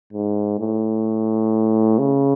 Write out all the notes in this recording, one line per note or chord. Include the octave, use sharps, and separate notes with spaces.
G#2
A2
C#3